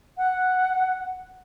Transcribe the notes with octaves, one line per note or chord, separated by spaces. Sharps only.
F#5